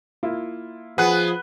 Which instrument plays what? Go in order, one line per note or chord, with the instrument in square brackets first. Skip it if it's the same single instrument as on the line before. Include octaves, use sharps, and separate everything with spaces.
[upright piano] A#3 E4 F4
[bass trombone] F3 [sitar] B3 [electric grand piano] G#4 F#6